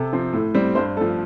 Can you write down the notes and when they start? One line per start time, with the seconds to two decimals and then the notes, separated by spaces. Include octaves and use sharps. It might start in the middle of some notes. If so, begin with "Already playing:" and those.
Already playing: C3 A4
0.13 F3 C4
0.33 A2
0.54 G3 C4
0.75 G2 C5
0.97 F3 A3 A4